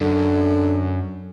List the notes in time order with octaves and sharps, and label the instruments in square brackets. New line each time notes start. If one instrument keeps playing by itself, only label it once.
[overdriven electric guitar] F#2 [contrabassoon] D3